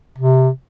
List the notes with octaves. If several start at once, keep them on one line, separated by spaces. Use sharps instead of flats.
C3